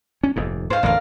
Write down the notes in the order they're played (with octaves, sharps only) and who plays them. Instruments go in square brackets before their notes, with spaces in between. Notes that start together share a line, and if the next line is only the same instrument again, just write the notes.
[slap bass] C#4
F1 D#2 G#2
[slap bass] G#2 [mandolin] C5 F5
[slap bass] A1 F2 D3 [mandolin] A#4 D5 F5